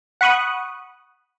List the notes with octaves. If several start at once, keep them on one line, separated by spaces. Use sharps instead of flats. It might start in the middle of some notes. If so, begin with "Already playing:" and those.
F#5 B5 C#6 D#6 F#6